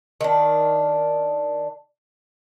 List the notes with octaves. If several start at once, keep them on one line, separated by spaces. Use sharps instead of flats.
D#3 D4